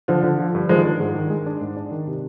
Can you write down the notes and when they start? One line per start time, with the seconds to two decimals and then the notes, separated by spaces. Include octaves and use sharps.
0.08 D3 F3
0.24 D3
0.39 F3
0.55 G2
0.69 D#3 F3 G#3
0.85 D4
1.00 G#2
1.15 D#3
1.30 G#3
1.46 D4
1.61 G#2
1.77 D4
1.91 D#3
2.07 C3